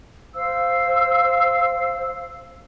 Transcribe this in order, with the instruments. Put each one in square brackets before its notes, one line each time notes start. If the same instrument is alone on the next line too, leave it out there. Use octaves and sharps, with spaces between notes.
[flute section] C5 F5 E6